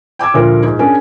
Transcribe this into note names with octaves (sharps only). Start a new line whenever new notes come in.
G5 D6 E6 G#6
D2 A#2 D3 F3 F4 A#4
G#2
C#4 D4 G#4 A#4